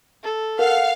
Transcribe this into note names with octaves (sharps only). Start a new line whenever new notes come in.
A4
A#4 F5 F#5